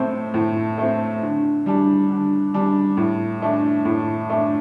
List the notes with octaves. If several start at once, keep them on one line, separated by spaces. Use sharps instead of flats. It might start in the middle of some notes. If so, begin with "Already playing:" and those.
Already playing: A2 A3 C4
A2
A3 C4
D3
G3 D4
D3
G3 D4
A2
A3 D4
A2
A3 D4